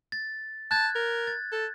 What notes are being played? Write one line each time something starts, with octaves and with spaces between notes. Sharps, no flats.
A6
A5 F#6 G#6 A6
A#4
A6
A4